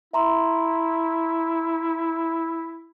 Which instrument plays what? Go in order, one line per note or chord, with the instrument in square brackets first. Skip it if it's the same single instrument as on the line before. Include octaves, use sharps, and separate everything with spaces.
[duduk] E4 [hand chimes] E5 A#5 C6